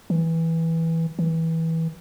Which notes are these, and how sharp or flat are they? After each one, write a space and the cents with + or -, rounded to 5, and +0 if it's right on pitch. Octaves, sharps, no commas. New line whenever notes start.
E3 -10
E3 -20